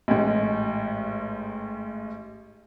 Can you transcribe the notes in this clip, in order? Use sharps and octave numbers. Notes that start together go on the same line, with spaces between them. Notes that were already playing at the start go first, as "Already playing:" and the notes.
A1 G#2